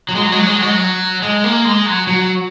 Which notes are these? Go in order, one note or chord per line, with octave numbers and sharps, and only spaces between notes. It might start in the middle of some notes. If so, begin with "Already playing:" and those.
F#3
G#3
F#3
G#3
F#3
G#3
F#3
G#3
F#3
G#3
A#3
G#3
F#3
F#3